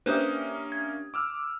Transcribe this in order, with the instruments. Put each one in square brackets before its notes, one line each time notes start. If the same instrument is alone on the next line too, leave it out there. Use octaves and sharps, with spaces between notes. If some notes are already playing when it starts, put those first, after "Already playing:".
[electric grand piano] A#3 C#4 D#6 [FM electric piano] D4 G4 E5 [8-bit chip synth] B4 C5
[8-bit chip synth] G#6
[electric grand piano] D6 E6 F6